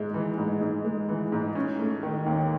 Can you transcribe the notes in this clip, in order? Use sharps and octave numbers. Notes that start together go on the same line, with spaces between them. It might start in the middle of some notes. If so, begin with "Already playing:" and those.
Already playing: G#2 G#3
E3
G#2
G#2
G#3
E3
G#2
C#4
A3
D#3
D#2